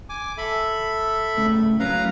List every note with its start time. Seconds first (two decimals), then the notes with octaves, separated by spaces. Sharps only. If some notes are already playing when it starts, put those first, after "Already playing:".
0.09 G#5 D6
0.38 A4 E5 B5
1.37 A2 C#3 A3
1.80 A2 F#3 C#4 B4 F5 A#5